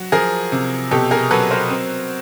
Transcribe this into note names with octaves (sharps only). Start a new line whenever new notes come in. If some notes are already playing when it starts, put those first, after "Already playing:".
Already playing: F#3
F3 G#4 A#4
C3
B2 G4 A4
G#4 A#4
F#3 A4 B4
A#4 C5
C4